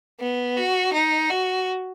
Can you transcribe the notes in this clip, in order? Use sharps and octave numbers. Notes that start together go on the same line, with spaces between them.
B3
F#4
D#4
F#4